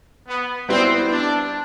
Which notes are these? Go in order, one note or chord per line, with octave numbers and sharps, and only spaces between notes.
B3
G3 B3 C4 E4 B4
D4